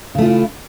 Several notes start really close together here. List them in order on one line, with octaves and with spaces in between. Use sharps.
C#3 A3 F4 E4